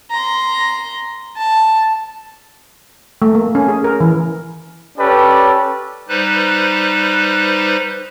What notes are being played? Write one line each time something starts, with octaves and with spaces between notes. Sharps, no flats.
A#5 C6
A5
A3
A#3
C#4
G#4
A#4
E3
C#4 G4 A4 B4 D5
G3 D#4 B4 C5 F#6